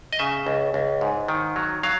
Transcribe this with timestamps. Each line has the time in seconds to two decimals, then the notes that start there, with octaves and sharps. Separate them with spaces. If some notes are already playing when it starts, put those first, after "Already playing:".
0.13 D#5
0.19 C#3 E5
0.47 C#2
0.74 C#2
1.01 G#2
1.28 D#3
1.56 F#3
1.83 F#3 F5